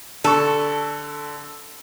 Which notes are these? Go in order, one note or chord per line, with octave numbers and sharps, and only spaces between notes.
D3 A4 C#6